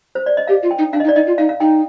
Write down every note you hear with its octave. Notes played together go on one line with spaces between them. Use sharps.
C5
D5
D#5
G4 F5
F4
G5
D#4
D4 F5
D#5
D#4
D5
D#4 D#5
F4
D#4 F5
F5
D#4 G5